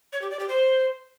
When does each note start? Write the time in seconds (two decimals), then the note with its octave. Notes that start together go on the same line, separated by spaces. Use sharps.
0.13 C#5
0.22 G4
0.31 D5
0.40 G4
0.48 C5